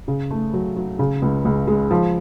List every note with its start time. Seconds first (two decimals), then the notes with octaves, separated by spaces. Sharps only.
0.08 C#3
0.31 A3
0.53 F#3
0.76 F#3
0.99 C#3
1.22 C#2
1.45 C#2
1.67 G#3
1.91 F3